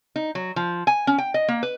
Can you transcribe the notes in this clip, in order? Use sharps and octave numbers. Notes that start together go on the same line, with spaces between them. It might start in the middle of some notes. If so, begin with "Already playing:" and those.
D#4
F#3
F3
G#5
C#4
G5
D#5
A#3
B4